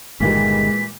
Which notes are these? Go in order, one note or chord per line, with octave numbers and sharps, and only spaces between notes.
G1 A#2 D#3 E3 G3 G#3 B6